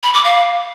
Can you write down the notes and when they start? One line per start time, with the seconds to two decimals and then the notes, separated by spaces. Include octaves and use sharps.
0.03 B5
0.14 D6
0.24 F5